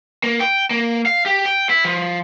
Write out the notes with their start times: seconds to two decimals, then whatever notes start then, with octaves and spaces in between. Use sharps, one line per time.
0.24 A#3
0.40 G5
0.71 A#3
1.06 F5
1.26 G4
1.46 G5
1.70 E4
1.85 F3